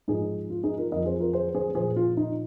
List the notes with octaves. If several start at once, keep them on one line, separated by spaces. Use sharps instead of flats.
G#2 F3 D#4 G#4
F4
D#4 G#4
F4 A#4
F2 F3 A#4 D#5
G#4 C5
F4 A#4
G#4 C5
G#4 C5
A#2 F3 G#4 C5
F4
D#4